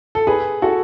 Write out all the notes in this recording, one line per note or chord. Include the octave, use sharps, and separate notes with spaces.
A4
G#4 B4
F#4 A4